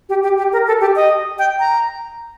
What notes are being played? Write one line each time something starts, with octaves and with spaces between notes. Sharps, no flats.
G4
G4
G4
A#4
A4
G4
D#5
G5
A#5